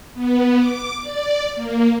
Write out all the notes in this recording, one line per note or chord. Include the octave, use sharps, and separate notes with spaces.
B3
D6
D5
A#3